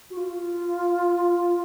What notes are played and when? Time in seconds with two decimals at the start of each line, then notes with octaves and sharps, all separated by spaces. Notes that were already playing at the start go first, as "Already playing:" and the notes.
0.10 F#4
0.17 F4